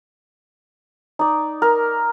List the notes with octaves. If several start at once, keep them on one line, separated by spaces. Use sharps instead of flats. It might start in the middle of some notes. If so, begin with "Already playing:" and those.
D#4 D5
A#4